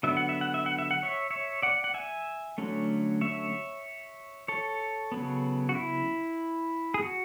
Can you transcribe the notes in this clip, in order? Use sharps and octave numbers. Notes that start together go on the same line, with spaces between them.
D3 F#3 B3 E5
F#5
E5
F#5
E5
F#5
E5
F#5
C#5 E5
C#5 E5
D5 F#5
F#5
E5 G#5
D3 F#3 A3 C#4
C#5 E5
A4 C#5
C#3 F#3 B3
F#4
E4
G#4
F#4